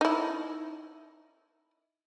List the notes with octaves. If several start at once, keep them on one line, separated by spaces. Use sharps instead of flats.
D#4 E4